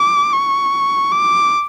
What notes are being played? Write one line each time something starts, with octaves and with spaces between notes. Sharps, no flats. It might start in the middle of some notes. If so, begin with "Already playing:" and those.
Already playing: D6
C#6
D6